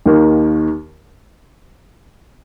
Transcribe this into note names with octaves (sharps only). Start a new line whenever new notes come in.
D#2 D#3 A#3